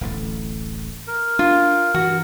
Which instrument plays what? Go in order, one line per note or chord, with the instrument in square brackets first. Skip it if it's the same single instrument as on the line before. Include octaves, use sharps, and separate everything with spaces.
[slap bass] D1 A1 A3
[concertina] A#4
[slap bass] D4 [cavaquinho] F4
[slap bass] G2 E3 [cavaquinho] F#4